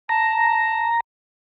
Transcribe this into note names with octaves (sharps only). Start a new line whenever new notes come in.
A5 A#5